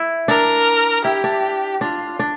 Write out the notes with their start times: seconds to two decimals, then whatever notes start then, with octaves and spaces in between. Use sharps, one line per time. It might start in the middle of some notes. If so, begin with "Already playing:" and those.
Already playing: E4
0.28 D4 A#4
1.05 E4 G4
1.24 D4
1.81 D4 F4
2.19 D4